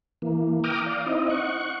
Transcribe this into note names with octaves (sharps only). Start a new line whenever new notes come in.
E3 A#3
G5 A#5 D6 D#6 F6
D5 F5
C4 D#4 E4 D#5
F#5 C#6